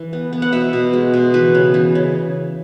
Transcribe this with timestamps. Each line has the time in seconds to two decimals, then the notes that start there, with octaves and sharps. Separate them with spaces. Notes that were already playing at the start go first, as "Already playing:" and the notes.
Already playing: E3
0.13 B3
0.33 B3
0.42 F#5
0.53 B2 E5
0.73 B2
0.93 G#3
1.14 B2
1.34 E3 B4
1.55 C#3
1.74 E3
1.95 C#3